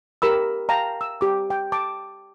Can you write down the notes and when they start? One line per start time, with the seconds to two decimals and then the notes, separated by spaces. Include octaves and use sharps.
0.22 G4 A#4 B5 E6
0.69 F5 G5 A5 A#5
1.01 E6
1.21 G4 D6
1.50 G5
1.72 A5 D6